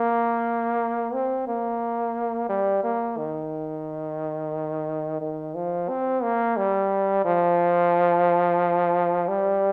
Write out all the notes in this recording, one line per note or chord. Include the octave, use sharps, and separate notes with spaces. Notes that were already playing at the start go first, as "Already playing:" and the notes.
Already playing: A#3
C4
A#3
G3
A#3
D#3
D#3
F3
C4
A#3
G3
F3
G3